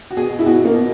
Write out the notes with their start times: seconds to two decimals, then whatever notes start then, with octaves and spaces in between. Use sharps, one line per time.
0.11 F#4
0.17 B2 G#4
0.39 E4
0.46 B2 F#4
0.65 A#3
0.74 B2